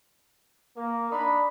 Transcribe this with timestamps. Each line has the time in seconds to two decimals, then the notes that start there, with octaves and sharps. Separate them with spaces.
0.77 A#3
1.11 D4 D#4 B5